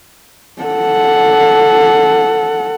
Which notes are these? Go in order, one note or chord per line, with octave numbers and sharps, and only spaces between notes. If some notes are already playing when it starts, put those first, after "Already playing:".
A4 F#5